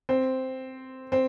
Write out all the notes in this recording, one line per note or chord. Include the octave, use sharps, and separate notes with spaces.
C4
C4